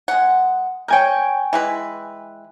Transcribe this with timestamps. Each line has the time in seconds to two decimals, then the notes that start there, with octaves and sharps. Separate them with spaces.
0.08 G#3 F#5
0.88 A#4 C#5 G5 G#5 G6
1.53 E3 G#3 B4